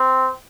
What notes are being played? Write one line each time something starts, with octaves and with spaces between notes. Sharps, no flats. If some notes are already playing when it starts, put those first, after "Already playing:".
Already playing: C4